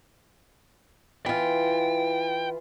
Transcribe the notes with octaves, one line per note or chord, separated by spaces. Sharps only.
E3 F4 G5